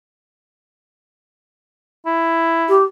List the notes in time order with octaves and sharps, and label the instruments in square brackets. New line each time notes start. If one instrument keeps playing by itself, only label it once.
[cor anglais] E4
[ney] G4